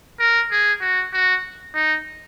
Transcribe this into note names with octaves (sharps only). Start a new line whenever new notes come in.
A#4
G#4
F#4
F#4
D#4